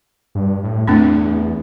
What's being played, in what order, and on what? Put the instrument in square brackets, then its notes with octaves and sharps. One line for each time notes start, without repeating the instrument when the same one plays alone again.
[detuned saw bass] G2
A2
[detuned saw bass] E2 [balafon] A3 C4 D4
[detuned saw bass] E2